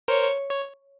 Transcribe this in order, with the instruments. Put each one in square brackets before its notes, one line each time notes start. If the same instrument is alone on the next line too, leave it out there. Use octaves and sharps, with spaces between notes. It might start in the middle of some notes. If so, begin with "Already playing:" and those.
[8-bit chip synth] A#4 C5 [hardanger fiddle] C#5
[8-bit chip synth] C#5